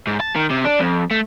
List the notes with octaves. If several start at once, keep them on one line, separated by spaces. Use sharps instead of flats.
G#2
A5
D#3
C3
D4
F2
A3